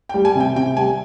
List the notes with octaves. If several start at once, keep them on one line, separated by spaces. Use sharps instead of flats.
G5
G3
G#5
C3 G5
C3 G5
G3 G#5